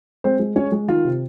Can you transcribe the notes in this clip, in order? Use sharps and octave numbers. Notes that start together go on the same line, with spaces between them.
G#3 C4 C5
G#3
G#3 C#4 C#5
G#3
D#3 F4
C3